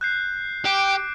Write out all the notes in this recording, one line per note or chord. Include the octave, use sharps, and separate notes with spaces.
F#6 G6 C7
G4 D6 D7